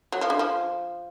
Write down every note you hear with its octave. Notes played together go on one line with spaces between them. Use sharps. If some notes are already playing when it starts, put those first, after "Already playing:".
F#3
F3
D3
F3